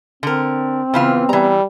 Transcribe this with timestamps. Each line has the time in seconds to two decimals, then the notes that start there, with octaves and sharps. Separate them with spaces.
0.23 D3 C4 A#4
0.94 C#3 E3 B3 F4
1.29 E3 G3 A#5